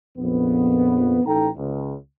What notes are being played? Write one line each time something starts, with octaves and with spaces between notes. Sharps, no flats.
A#1 F2 B3
A1 D#4 A4 G5 A#5
C#2